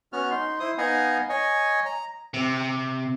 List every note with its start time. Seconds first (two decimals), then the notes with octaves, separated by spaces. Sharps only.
0.13 B3 C#4 F#4 F6
0.31 D#4 C6
0.60 E4 C5 D#6
0.78 B3 D#4 D#5 F5 F#5 G#5
1.29 C#5 D#5 G#5
1.86 A#5
2.34 C3